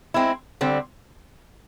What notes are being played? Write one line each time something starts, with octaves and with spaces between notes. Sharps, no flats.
G#3 C4 E4
D3 G3 C4